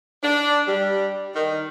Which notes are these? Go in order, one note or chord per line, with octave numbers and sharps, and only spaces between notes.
D4
G3
D#3